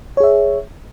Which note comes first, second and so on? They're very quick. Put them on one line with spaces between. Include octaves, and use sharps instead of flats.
C#5 G#4 E5